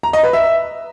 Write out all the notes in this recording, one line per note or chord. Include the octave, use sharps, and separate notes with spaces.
A#5
D#5
B4
E5